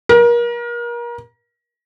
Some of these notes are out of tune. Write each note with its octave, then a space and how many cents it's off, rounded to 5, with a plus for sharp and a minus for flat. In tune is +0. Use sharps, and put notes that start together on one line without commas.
A#4 +30